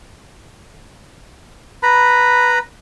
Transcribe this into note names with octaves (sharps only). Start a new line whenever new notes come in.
B4 A#5 B5